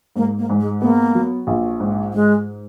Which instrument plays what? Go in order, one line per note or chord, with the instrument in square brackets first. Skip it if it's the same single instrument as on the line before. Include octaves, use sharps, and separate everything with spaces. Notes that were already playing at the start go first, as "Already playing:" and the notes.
[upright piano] G#2 [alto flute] A#3
[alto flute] A#3
[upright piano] G#2
[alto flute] G#3
[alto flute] A#3 [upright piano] B3
[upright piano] F#3
A#1
G#2
[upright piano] G#2 [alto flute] G#3